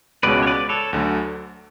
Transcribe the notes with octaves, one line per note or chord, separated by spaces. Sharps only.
C#2 B2 G#3 C#4 B4 D5
C#5
B4 D5
A4 C#5
D2 D3 F#3